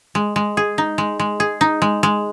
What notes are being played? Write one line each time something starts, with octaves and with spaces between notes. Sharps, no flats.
G#3
G#3
G#4
D#4
G#3
G#3
G#4
D#4
G#3
G#3